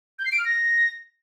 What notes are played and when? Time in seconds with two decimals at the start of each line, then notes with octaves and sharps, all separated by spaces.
0.19 G6
0.25 C7
0.32 D7
0.38 F6
0.45 A#6